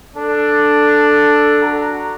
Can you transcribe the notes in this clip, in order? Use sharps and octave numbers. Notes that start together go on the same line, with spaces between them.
D4 A4
F#4 F#5 A#5